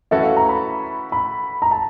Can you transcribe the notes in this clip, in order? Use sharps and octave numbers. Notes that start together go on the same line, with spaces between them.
E3 A3 C#4 F#4 A4 E5
F5
A#5
B5
B5
A#5
A5